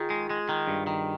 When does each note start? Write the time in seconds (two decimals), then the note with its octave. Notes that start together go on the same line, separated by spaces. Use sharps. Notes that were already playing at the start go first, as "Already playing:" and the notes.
Already playing: D#3 F4 G#4
0.10 G#3
0.30 G#3
0.49 D#3
0.67 G2
0.87 D#3